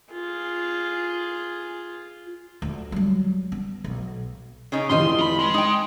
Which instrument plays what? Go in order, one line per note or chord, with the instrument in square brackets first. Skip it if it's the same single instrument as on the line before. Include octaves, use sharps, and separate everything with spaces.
[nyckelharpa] F4 G#4
[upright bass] D2
F#3 G3
B3
B1
[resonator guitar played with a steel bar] C#3 C#4 D#4
[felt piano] F1 E3 [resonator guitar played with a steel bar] F4 G4 D#5 [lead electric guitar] C6
[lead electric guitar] F3 B5
G#3
[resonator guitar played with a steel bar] D#4 G5 [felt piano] D#6